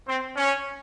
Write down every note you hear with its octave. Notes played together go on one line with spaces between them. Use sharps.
C4
C#4